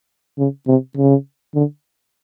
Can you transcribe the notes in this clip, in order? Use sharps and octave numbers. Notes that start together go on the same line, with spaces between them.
C#3
C3
C#3
D3